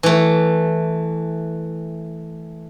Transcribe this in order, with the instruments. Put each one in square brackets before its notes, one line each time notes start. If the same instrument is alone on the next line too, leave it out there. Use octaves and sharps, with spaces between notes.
[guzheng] E3 A3